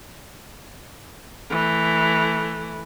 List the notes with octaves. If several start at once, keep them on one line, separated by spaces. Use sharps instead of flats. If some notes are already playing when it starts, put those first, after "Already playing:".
E3 A3